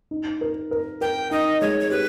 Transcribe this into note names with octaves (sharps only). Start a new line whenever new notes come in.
D#4
A#4
A#4
A#4 G5
D#4 D#5
G#3 C#5
C#5
G4 B4